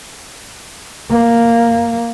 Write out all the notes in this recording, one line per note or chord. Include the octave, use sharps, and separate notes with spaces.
A#3